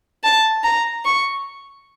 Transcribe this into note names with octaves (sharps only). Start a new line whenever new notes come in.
A5
A#5
C#6